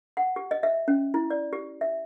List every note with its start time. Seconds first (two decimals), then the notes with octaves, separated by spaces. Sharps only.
0.17 F#5
0.36 G4
0.51 D#5
0.63 E5
0.88 C#4
1.14 E4
1.30 D5
1.53 G4
1.81 E5